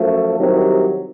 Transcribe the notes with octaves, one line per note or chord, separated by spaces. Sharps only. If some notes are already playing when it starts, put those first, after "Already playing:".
Already playing: F#2 F3 A3
C2 C3 D#3 F#3